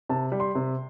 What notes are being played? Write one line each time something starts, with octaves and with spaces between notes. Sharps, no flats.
C3 A5
G3
C6
C3